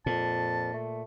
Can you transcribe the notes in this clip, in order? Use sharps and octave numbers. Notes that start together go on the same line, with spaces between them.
F2 A#2 A5
A3